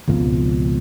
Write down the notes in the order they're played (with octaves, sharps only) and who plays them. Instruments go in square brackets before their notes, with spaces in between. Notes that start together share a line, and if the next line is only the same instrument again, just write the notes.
[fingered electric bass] G#1 C#2 B2 F3